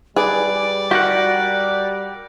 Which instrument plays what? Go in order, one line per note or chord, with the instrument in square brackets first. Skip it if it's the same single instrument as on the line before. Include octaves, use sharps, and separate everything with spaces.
[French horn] G3 [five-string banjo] G#4 B4 [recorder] D5
[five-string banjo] F#4 [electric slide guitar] G4 A#4 F#5